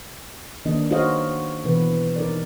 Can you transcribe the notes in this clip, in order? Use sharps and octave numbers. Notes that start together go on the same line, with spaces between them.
D#3 A#3 D4 D#5
D#4 F#4 C5 C#5 D#5 F5
B2 E3 B4
D#4 A#4 D5